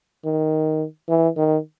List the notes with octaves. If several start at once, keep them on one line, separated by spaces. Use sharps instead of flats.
D#3
E3
D#3